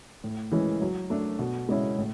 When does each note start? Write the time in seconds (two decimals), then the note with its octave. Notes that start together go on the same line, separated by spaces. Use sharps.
0.24 A2
0.52 E3 G#3 C#4 E4
0.81 F#3
1.10 A3 D4
1.39 B2
1.69 G#3 C#4 E4
1.98 A2